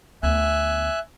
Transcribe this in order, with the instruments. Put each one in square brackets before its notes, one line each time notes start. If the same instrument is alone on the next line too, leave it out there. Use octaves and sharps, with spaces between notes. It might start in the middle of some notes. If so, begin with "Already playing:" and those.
[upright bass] D2 B3 [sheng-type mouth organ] E5 G#5 F#6